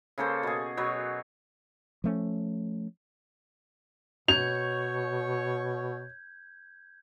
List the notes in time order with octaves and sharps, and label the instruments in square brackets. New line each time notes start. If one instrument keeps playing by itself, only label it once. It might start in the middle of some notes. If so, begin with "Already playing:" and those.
[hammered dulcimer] C#3 A#3 A4 C5
B2 G#4
B2 F#3 C#5
[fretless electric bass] F3 A3 C#4
[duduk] B2 [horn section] C#5 [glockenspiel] G6 G#6 [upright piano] F7